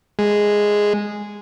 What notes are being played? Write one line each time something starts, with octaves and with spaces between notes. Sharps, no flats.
G#3